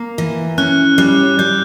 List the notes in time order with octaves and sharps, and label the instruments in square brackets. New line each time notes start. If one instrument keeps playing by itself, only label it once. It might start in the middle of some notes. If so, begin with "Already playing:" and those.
Already playing: [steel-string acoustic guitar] A#3
E3
[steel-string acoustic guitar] C#4 [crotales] F#6
[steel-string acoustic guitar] G3 [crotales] F#6
[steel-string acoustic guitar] G3 [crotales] G6